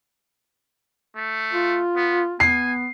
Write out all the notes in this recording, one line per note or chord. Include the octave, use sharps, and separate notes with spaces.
A3
F4
B3
B3 G#5 C7